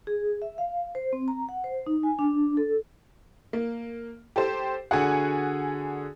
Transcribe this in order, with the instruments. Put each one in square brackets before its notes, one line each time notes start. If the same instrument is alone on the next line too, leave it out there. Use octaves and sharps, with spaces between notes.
[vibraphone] G#4
E5
F5
C5
C4
A#5
F#5
C5
D#4
G#5
D4
A4
[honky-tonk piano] A#3
G4 A4 C5
[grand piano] D3 F#4 G#4 [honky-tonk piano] F#5 G#5